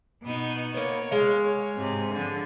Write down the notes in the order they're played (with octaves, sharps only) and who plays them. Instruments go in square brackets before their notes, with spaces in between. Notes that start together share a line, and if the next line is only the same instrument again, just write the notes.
[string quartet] B2 B3 D#4
[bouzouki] A#3 B3 [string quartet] C#5
[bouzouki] G#3 F5
[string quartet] C#5
G#2 C3
D3 F3